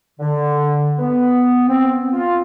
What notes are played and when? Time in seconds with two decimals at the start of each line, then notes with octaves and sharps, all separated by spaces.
0.20 D3
0.97 B3
1.68 C4
2.12 F4